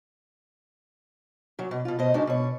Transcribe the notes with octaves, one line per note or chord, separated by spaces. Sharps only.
A#2 F#3
B2
B2 F4
B2 C5 D#5
F#2 C#3 F#3 G#3 D4 D#4
B2 C#5